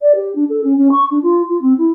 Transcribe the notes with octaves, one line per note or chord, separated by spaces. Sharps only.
D5
G4
D4
A4
C#4
C#4
C#6
D4
F4
F4
C4
E4